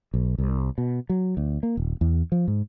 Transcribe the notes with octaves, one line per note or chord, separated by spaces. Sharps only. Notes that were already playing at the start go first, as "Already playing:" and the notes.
B1
C2
B2
F#3
D2
A#3
D#1
E2
F3
G#2